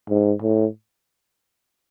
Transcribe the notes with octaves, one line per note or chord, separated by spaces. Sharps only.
G#2
A2